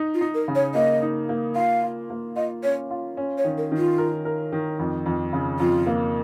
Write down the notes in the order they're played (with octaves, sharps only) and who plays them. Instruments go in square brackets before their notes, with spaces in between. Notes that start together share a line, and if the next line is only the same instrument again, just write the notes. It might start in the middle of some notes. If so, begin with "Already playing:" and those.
Already playing: [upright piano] D#4
[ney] F4
[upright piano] D#4
[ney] A#4
[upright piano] C#3
[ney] C#5
[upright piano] A#3 [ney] D#5
[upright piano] D#4
A#3
[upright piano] F4 [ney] F5
[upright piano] F4
A#3
[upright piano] F4 [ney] D#5
[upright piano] C#4 [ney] C#5
[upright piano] F4
C#4
[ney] C#5
[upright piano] D#3
[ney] A#4
[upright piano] D#3
[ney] F4
[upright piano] A#4
A#4
D#3
F2
F2
C#3
[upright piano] F2 [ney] F4
[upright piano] A#3